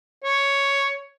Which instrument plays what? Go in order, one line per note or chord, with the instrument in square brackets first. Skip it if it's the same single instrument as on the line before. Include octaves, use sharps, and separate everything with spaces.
[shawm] C#5